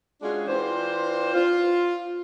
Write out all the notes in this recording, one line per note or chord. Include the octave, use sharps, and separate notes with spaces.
G#3 C#4 D4 F4 F#4 G#4
E3 C4 D4 F4 C5
F4